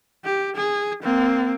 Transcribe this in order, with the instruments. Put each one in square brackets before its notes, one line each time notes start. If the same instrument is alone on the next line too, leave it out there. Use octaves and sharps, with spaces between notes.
[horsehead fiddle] G4
G#4
A#3 C4